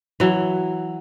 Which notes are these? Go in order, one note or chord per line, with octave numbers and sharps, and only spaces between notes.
E3 F#3